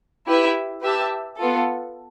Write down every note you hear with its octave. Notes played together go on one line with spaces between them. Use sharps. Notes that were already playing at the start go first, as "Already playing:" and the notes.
E4 G4 B4 E5
G4 B4 E5 A5
B3 F4 A4